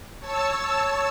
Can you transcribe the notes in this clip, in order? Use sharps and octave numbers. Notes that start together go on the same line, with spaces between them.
C#5 A5 E6